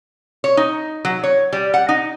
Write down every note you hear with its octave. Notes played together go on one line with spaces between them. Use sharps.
C#5
D#4
F#3
C#5
G3
F#5
D#4